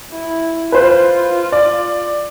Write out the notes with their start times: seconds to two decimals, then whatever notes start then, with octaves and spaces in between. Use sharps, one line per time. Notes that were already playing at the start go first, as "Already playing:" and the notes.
0.12 E4
0.72 F4 B4 C5 F#6
1.52 D5